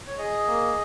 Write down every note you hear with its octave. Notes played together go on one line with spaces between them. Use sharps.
C#5
G#4 D#5
A#3